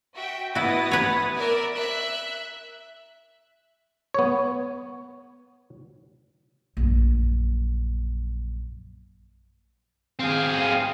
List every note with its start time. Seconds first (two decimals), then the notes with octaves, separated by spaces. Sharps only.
0.15 F#4 E5 G5
0.55 B3 E4 F#4 D#6 A6
0.91 B4 C#5
1.37 A#4 D5 E5
1.76 E5 F#6
4.14 B3 C#5
6.77 A#1 F#2
10.20 C4 G#4 F5
10.60 F5